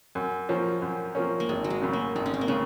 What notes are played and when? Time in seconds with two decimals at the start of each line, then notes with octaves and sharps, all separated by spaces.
0.15 F#2
0.49 F3 A#3 C#4
0.82 F#2
1.15 F3 A#3 C#4
1.40 A#3
1.49 G#1 G#3
1.64 F#3
1.70 G#3
1.82 F#2 C#3
1.93 A#3
2.15 G#1 G#3
2.26 C#4
2.34 C4
2.41 A#3
2.48 C#3 G#3